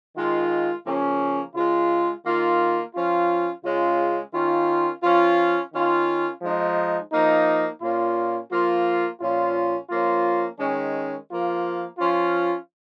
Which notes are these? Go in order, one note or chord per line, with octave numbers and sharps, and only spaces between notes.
D#3 G#3 F4
C#3 F3 A#3 C#4
C#3 G#3 F4
D#3 A#3 F4
F3 C#4 F4
C#3 G#3 C#4 F4
D#3 C#4 F4
F3 C#4 F4
D#3 C#4 F4
F3 G#3 D#4
F3 A#3 D#4
A#2 A#3 C#4 F4
F3 A#3 F4
A#2 F3 C#4 F4
F3 A#3 C#4 F4
D#3 G#3 C#4
F3 A#3 F4
F3 C#4 F4